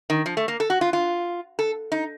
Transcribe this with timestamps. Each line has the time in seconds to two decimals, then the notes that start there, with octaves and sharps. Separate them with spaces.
0.10 D#3
0.26 F3
0.37 A3
0.48 A#3
0.60 A4
0.70 F#4
0.81 F4
0.93 F4
1.59 A4
1.92 D#4